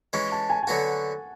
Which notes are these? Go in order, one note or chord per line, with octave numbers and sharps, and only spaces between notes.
E3 G#3 C#4 C#6
A5
G#5
G#5
D3 F#3 B3 F#4 F#5